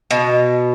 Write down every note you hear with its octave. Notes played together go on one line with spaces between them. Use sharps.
B2